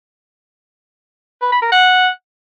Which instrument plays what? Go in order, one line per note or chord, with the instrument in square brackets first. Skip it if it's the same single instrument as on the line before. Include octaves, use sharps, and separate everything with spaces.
[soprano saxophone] B4
B5
A#4
F#5